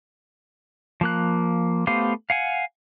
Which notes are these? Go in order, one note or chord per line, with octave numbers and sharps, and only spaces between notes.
F3 A#3 F#6
A3 B3 G4 C5 F5
F5 F#5 G#5